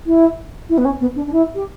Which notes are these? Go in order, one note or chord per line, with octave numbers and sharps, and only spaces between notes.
E4
E4
B3
C#4
B3
D4
D4
E4
G4